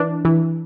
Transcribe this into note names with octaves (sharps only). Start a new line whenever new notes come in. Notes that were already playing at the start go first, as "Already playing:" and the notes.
Already playing: E3 D4
E3